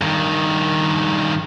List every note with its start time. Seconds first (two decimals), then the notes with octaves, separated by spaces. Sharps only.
0.02 G2 D#3